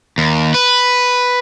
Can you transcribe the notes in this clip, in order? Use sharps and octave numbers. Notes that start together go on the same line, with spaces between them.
D#2
B4